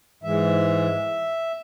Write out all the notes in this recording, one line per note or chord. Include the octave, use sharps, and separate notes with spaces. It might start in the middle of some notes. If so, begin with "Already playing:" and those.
G#2 E3 G#3 E5